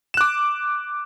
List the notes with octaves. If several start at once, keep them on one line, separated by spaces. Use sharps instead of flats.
D6 F#6 E7